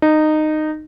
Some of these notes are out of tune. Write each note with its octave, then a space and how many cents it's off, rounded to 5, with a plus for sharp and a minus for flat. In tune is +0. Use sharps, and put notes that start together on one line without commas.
D#4 -15